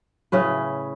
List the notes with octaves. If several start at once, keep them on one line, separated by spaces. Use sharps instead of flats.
A2 C#3 C#4 B4